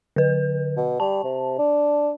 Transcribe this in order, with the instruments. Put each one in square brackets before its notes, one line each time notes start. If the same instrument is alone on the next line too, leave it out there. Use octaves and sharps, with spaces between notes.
[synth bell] D3 B4
[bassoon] B2
[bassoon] G3 [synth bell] A5
[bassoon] C3
D4